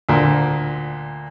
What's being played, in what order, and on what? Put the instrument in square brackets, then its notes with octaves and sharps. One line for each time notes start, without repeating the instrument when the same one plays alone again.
[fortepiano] D2 A#2